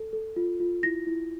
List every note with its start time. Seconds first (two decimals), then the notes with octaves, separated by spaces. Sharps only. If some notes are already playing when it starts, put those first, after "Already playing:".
Already playing: A4
0.13 A4
0.36 F4
0.60 F4
0.83 E4 A#6
1.07 E4